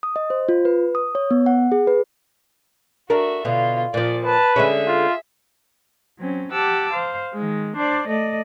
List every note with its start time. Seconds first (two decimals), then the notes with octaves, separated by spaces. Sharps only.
0.03 D#6
0.16 D#5
0.30 C5
0.49 F4
0.65 B4
0.95 D#6
1.15 C#5
1.31 B3
1.46 F#5
1.72 G#4
1.87 B4
3.10 D4 F#4 A#4 E5
3.45 B2 D3 F4
3.94 A#2 F3 D5
4.25 B4 A5
4.56 D3 G#3 C#4 G#4 E5
4.87 F4
6.19 F#3 C4 C#4
6.52 G4 F#5 A5 D6 E6
6.92 C5 F5
7.34 D#3 G#3
7.76 D4 C5 D5
8.08 A3 D5 D#5